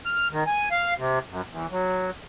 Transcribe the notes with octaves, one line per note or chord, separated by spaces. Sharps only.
F6
D#3
G#5
F5
C3
F#2
E2
F#3